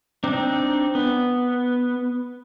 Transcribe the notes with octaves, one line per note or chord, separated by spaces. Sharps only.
C4 D4 D#4
B3